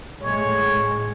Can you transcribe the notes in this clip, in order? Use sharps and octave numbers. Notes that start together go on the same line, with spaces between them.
A2 G#3 C#5